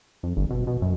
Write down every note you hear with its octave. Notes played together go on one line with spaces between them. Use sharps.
F2
G1
B2
B2
F#2